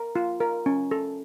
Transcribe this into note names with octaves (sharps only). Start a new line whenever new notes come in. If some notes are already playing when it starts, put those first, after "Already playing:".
Already playing: A#4
F4
A#4
C#4
A4